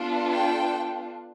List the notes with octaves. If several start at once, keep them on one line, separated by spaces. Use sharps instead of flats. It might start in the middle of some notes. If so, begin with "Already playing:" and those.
Already playing: B3 D4 F4 A4
G5